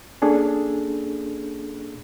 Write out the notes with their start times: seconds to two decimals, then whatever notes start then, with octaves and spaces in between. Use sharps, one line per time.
0.22 A#3 C#4 D4 G#4 A4